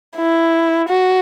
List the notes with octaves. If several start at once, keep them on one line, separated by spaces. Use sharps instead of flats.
E4
F#4